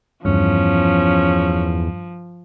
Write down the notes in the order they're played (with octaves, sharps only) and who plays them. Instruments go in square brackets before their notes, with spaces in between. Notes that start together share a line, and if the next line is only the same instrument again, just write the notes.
[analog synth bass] E2 [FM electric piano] G2 [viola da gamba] F3 [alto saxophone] C#4